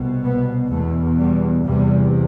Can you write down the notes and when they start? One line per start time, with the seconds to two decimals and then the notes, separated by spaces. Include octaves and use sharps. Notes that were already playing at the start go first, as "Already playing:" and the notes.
Already playing: C2 B2
0.24 B3
0.71 E2 B2 A3
1.18 G3
1.65 E2 C3 G3